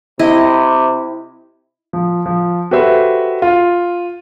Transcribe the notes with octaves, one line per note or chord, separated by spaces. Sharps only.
C3 E4 D#5
F3
F3
F#4 G4 A4 B4 C5 E5
F4